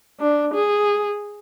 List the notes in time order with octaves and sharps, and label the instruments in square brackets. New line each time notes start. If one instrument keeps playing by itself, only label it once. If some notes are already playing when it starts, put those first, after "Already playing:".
[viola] D4
G#4